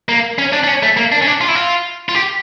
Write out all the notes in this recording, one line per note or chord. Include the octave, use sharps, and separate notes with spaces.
A#3
C#4
D4
D4
C#4
A3
A#3
D4
C#4
D4
F4
E4
F4
F4
G4